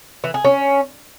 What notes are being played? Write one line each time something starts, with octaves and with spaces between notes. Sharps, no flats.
E3
G#4
C#4